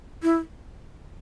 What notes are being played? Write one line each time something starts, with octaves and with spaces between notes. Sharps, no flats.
E4